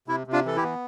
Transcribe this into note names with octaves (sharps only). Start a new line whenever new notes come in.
C3 E4
C3
D4 F4
E3 A4
E4 G4
B3